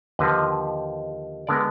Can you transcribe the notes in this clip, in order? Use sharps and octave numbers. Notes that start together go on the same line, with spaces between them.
D#2 D3 F3 B4 D#5
D3 G#3 B3 A#4 D5